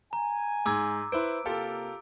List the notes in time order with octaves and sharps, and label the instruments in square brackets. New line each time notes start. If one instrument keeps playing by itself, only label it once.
[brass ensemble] G#5 [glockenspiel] A#5
[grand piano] G#2 G#6 [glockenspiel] D6 E6
[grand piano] E4 B4 C5 [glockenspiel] D7
[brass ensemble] C3 A#3 [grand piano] F4 G4 A4